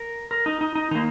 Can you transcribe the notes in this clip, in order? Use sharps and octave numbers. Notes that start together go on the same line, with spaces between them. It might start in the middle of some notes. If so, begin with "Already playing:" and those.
Already playing: A#4
A#4
D#4
D#4
D#4
D#3 A#3 D#4